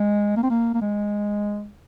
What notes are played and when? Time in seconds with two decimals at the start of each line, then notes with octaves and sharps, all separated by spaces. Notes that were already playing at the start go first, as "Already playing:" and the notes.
Already playing: G#3
0.36 A#3
0.43 C4
0.50 A#3
0.75 A#3
0.81 G#3